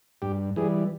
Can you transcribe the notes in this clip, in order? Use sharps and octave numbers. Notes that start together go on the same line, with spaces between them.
G2 G4
E3 G3 G#4